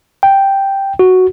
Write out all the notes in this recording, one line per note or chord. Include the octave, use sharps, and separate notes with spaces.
G5
F#4